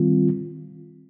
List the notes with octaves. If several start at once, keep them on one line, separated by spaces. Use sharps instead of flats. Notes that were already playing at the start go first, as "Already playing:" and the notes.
Already playing: D#3 G3 C4 F4